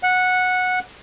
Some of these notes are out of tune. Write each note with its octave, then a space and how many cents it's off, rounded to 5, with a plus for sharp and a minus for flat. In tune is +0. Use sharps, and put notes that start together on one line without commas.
F#5 -10